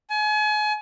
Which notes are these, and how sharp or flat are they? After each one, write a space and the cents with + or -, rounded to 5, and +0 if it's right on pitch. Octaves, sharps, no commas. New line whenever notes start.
G#5 +35